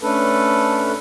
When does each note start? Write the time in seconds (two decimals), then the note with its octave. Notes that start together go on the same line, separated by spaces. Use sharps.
0.01 A3 C#4 D4 A4 B4